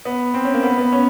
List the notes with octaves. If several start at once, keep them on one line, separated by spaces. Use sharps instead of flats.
B3
C4
C#4
A#3
B3
B3
C#4